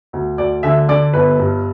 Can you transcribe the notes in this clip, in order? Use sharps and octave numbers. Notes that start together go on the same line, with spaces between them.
D2
D2 D5
D3 E5
D3 D5
G1 B4
G2